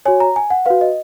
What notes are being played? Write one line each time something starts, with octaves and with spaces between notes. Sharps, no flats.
F#4 C#5 G#5
A#5
G#5
F#5
F#4 B4 F5
D#5